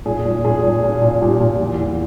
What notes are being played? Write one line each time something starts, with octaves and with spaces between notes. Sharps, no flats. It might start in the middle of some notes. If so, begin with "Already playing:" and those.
A#2 G#4
A#2
A#2 G#4
A#2
A#2
A#2
A#2 G4
A#2
E2
E2